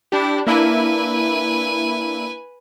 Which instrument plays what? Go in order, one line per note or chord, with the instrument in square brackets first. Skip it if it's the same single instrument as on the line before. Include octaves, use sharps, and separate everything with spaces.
[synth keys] D4 G4 [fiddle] E4
[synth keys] A#3 D4 E4 [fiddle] B4 G#5